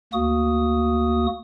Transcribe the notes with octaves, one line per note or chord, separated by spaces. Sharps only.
D2 A#3 F#4 D#6